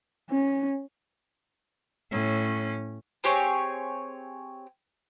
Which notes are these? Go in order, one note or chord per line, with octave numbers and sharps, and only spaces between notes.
C#4
A2 C#4
C4 G4 G#4 C#5